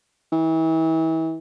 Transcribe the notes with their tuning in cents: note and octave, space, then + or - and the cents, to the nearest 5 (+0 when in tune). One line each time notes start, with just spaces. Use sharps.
E3 -35